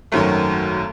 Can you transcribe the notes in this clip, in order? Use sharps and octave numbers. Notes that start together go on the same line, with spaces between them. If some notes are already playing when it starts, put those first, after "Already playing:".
G#1 F#2 D#3 F#3 A3